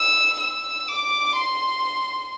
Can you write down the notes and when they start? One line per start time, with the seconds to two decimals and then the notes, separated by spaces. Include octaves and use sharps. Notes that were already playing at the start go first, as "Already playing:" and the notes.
Already playing: E6
0.40 E6
0.88 D6
1.35 C6